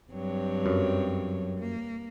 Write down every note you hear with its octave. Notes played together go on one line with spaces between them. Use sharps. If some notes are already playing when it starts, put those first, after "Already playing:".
G2 F#3 C4 C#5
F#2
A#3